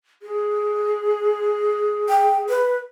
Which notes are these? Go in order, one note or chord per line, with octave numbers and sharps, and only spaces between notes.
G#4
G5
B4